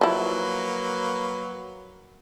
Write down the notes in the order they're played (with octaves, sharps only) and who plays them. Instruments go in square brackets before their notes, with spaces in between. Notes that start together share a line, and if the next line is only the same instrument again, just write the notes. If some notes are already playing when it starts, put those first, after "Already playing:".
[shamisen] F3 E4 [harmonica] F#3 A#3 B4